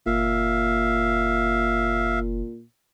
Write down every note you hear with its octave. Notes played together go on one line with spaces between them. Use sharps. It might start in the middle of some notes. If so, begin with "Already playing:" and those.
F#1 A#2 E5 F5